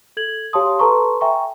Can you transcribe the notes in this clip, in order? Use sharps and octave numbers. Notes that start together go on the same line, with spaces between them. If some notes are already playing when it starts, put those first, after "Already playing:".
A4 G#6 F#7
G4 C#5 F5 A5 C6 D#6
A4 B4 A5 A#5 C6 C#6
E5 G5 G#5 A#5 C#6